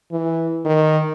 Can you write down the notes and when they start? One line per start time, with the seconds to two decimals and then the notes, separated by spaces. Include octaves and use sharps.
0.12 E3
0.65 D#3